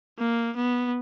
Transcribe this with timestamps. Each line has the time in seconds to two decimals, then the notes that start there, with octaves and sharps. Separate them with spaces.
0.18 A#3
0.56 B3